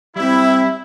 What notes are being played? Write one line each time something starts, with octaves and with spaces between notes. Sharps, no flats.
G3 C4 E4